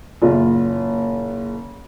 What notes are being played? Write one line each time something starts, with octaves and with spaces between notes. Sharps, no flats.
F#1 A#2 F4